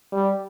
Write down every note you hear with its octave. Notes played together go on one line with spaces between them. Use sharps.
G3